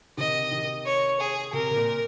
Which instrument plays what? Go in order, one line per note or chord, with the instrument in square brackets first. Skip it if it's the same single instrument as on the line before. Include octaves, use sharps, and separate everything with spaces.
[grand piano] C3 D#3 [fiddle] D#5
[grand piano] C3 D#3
[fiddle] C#5
G#4
[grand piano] C3 [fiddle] A#4
[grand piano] C3
A#2